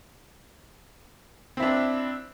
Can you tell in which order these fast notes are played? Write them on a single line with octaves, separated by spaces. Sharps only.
C4 E4 D4